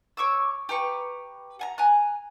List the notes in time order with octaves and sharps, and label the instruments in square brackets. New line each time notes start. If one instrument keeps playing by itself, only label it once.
[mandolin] C#5 C#6 D6 E6
G4 B4 A#5 C#6
F#5 G#5 A#5
G#5 A#5 F#6